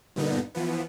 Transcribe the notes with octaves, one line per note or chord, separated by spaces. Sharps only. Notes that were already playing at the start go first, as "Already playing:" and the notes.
G2 A#2 D3 B3 D#4
E3 F3 B3